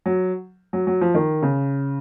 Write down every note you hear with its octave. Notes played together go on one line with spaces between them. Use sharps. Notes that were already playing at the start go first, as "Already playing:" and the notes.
F#3
F#3
F#3
F3
D#3
C#3